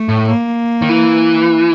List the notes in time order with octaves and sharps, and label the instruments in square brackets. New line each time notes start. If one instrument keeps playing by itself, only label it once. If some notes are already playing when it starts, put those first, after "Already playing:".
Already playing: [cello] A3
[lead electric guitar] A2
[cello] A#3
[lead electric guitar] D#3
E3